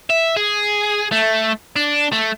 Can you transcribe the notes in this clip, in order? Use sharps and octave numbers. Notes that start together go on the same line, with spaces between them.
E5
G#4
A3
D4
A3